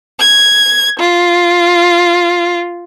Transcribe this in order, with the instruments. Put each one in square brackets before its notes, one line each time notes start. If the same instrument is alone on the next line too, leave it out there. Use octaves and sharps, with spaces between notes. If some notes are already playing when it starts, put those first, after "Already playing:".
[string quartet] G#6
F4